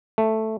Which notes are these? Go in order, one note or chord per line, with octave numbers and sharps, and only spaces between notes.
A3